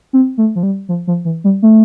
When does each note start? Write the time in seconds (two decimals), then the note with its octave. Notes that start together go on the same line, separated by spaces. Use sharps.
0.13 C4
0.38 A3
0.56 F3
0.63 G3
0.89 F3
1.07 F3
1.25 E3
1.44 G3
1.62 A3